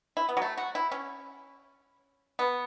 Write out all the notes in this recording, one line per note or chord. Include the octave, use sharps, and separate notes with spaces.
E4
B3
F#3
A3
F#4
E4
C#4
B3